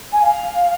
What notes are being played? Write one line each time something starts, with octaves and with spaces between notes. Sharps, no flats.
G#5
F5